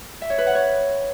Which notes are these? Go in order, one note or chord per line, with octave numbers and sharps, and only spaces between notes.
E5
C#5
B4
F#5
C#5